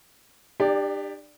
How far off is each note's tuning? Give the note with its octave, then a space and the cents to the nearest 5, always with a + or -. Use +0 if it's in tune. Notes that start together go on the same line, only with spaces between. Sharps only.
D4 +40 G4 +20 D5 +0